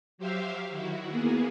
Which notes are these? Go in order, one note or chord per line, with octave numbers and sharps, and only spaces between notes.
F#3 G4 C5 E5 F5
D#3 E4 F#4
A#3 B3 G#4